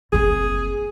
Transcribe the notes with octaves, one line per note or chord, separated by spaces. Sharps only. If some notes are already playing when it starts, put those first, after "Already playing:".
F#1 C4 G#4